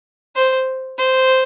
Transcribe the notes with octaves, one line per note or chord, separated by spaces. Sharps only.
C5
C5